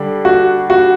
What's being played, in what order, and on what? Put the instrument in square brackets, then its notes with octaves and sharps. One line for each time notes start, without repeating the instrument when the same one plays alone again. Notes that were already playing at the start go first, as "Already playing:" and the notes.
Already playing: [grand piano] D3 G3 D4
[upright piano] F#4
F#4